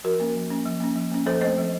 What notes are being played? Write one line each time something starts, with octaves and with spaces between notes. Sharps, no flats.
F3 F#4 A#4
A#3 C#4
F3
A#3 C#4
F3
A#3 C#4
F3
A#3 C#4
F3 A4 C5
A3 C4 C5 D#5
F3